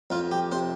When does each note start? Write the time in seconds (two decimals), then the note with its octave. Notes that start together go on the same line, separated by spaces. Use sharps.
0.10 F2 F4
0.31 G4
0.52 C3 C5